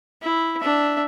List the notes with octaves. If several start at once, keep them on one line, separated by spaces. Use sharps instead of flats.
E4
D4 E5